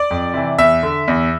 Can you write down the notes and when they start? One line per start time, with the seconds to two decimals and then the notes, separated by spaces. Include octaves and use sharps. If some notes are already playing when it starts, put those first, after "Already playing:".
Already playing: D5
0.11 F2
0.34 C3 E3
0.58 E2 E5
0.83 D3
1.08 E2